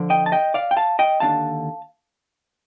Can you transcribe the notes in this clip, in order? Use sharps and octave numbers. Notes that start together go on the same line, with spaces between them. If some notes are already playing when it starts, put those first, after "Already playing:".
Already playing: D3 F3
D#5 G5
A5
D#5 G5
D5 F5
G5
F5 A5
D#5 G5
D#2 D3 A3 D4 F5 A5